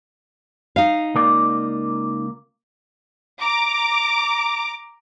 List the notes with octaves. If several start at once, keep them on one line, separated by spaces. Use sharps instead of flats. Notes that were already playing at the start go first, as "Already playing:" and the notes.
D#4 F5
C#2 A#3 D5
A#5 D6